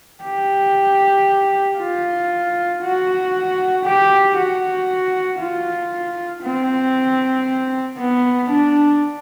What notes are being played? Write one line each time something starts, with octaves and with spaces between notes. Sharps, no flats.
G4
F4
F#4
G4
F#4
F4
C4
B3
D4